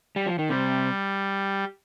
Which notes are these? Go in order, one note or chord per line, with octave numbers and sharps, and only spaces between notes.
G3
F3
D#3
C3 G3